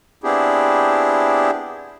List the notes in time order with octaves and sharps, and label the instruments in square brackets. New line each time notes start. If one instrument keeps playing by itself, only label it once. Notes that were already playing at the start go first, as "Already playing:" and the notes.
[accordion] B3 C4 D4 E4 G4 G#4